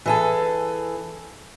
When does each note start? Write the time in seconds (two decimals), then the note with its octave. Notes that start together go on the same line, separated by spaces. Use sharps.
0.06 E3 G#4 A4